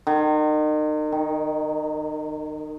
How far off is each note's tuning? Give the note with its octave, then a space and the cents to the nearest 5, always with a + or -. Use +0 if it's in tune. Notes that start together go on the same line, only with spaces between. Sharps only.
D#3 -35
D#3 +5